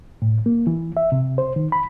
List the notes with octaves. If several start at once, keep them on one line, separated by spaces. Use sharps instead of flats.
A2
A#3
E3
E5
C3
C5
D#3
B5